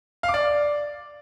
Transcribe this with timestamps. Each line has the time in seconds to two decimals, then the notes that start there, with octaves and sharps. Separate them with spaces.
0.23 F5
0.29 D6
0.34 D5